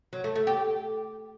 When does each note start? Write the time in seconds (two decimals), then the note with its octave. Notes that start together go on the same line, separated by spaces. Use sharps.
0.13 F#3
0.24 A3
0.36 A3
0.47 G4